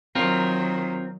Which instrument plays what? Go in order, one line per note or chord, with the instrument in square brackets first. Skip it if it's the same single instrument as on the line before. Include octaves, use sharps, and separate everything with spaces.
[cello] D#3 F#3 [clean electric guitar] C4 F4 A#4